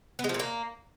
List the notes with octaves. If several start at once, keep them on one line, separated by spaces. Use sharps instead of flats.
B3
G#3
F3
A#2
A#3